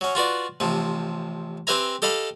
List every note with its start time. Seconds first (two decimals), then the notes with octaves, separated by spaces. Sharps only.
0.01 F#3 C#4
0.15 F4 F#4 B4 D5
0.60 A1 C3 F3
1.67 C4 G4 B4 E5 G#5 A#5
2.02 G4 A4 D#5 F5 B5